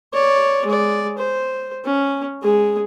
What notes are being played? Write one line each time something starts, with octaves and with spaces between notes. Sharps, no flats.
C#5 D5
G#3 D5
C5
C#4
G#3 G#4